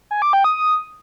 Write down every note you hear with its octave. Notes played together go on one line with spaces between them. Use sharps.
G#5
D6
G5
D#6